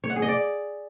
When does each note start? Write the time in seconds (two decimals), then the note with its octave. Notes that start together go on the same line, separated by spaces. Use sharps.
0.04 C#5
0.10 F#5
0.16 G#4
0.22 D#5
0.28 D5